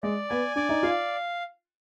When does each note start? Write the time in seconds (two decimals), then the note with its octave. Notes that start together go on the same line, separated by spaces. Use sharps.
0.03 G#3 D5
0.30 B3 G#5
0.56 D4 D5
0.69 D#4
0.83 F4 F5